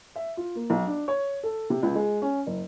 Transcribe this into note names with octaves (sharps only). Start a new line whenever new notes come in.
E5
F4
A#3
B1
D4
C#5
A4
C3
C#2
G#3
C#4
F#1